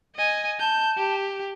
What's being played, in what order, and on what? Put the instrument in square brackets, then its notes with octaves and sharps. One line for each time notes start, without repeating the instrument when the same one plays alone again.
[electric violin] D#5 G#5
[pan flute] A5 [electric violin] G6
[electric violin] G4